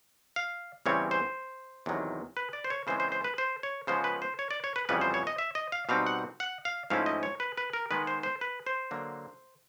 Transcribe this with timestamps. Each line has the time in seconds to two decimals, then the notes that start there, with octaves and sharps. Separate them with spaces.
0.36 F5
0.86 E2 C#3 E3 G3 C4 C#5
1.11 C5
1.86 E2 C3 D#3 F#3
2.37 B4
2.53 D5
2.64 C5
2.70 C#5
2.87 C#3 E3 G#3 C4 C5
3.00 C5
3.12 C5
3.24 B4
3.38 C5
3.63 C#5
3.87 C#3 F3 G#3 B3 C5
4.04 B4
4.22 C5
4.39 C#5
4.51 D5
4.64 C#5
4.76 B4
4.89 F2 C#3 E3 G3 B3 B4
5.01 C5
5.14 C#5
5.27 D#5
5.38 E5
5.55 D#5
5.72 F5
5.89 B2 G3 C4 D#4 F5
6.07 F#5
6.40 F#5
6.65 F5
6.90 G#2 F3 A3 C#4 E4 F5
7.06 D#5
7.23 C#5
7.40 B4
7.57 B4
7.73 A#4
7.91 D#3 G#3 B3 B4
8.07 C5
8.23 C5
8.41 B4
8.67 C5
8.91 D3 F#3 A#3